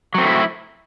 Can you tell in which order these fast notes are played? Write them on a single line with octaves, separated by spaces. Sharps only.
F#3 C4 A3 E4